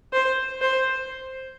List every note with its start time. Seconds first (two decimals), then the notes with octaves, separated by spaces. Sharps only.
0.13 C5
0.61 C5